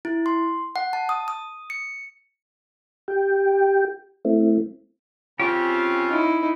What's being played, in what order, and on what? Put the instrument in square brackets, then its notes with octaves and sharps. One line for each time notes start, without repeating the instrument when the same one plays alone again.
[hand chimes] E4
C6
F#5
A5
D#6
D#6
C#7
[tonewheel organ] G4 G5
A3 C4 E4
[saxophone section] C#3 C#4 F4 [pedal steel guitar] C4 G4
[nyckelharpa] D#4 E4